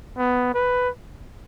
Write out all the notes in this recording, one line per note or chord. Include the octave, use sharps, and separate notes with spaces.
B3
B4